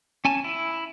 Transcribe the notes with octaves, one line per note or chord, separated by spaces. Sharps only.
C#4 G#5 A5
E4